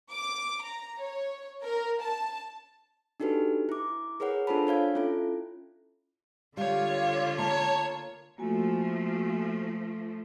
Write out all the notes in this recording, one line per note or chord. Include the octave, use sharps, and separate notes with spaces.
D6
A#5
C#5
A#4
A5
D4 D#4 F#4 G4 A4 B4
E4 D6
G#4 A#4 B4 C#5 F#5
D4 F4 A4 C5 A5 B5
D4 C#5 F5 G#6
C#4 E4 F4 A4
D3 G3 F4 C#5 F5
A#3 C#5 A5 A#5
F3 A3 A#3 F#4 G#5